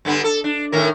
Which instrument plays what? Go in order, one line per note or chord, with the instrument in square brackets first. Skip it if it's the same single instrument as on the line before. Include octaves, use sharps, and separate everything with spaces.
[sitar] G2 D3 B3
A4
D4
A2 D#3 A#4